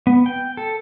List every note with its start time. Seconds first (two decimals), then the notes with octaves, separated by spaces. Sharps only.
0.07 B3
0.26 G5
0.57 A4